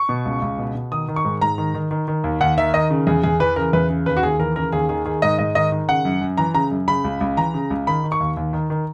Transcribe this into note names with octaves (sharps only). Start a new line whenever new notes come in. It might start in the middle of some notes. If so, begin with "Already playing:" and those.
Already playing: C#6
B2
C#2
C#2
B2
B2
D#3 D#6
D#3
C#6
G#2
G#2 A#5
D#3
D#3
D#3
D#3
D#2
D#2 F#5
D#3 E5
D#3 D#5
C#3
E2 G#4
E2 G#4
E3 B4
C#3 A#4
E2 B4
C#3
D#2 B4
F#4
D#2 G#4
E3 A#4
C#3 A#4
D#2 G#4
D#3 G#4
D#3 G#4
G#2 D#5
G#2 D#5
D#3 D#5
D#3
C#3 F#5
F#2
F#2
E3 A#5
C#3 A#5
F#2
C#3 B5
C#2
C#2
E3 A#5
C#3
C#2
D#3 B5
D#3
C#6
D#2
D#2
D#3
D#3